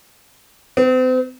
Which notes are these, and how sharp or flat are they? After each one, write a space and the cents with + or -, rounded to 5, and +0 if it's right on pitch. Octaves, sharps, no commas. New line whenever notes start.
C4 -40